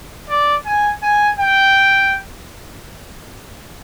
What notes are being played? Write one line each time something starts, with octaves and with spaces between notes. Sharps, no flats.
D5
G#5
G#5
G5